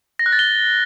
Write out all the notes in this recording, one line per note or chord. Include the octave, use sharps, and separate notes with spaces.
A#6
F#6
A6
G7